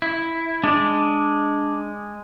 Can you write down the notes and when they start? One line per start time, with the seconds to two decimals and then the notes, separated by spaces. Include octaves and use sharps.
0.02 E4
0.64 G#3 D4 D5